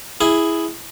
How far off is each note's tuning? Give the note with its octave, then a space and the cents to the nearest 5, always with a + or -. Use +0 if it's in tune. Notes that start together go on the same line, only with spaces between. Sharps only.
E4 +0 G#4 +0